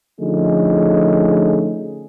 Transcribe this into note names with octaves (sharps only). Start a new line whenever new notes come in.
D3 F3 A3 C#4 D#4 G#4